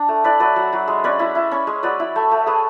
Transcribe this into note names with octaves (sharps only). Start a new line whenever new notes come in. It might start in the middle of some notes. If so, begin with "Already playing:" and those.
Already playing: D4
A3
E4 B4 D5
F#3 B4 D5
F#3
F#3
G#3
C#4 B4 D5
E4
E4
C#4
G#3
F#3 B4 D5
E4
A3
A3
A3 G#4 B4